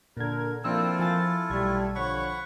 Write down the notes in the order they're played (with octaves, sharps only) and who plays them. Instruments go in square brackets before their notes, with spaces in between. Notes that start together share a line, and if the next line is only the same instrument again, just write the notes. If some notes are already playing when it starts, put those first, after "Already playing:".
[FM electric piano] A#2 G#6 [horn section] D3 A#4
[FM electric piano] F3 D4 E6 [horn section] A#3 C4 [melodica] E4 F4 A4
[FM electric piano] F3 G#5 A6
[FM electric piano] B1 G#6 [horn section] G3 A3
[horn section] D3 F3 C#5 [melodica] F#5 B5 C#6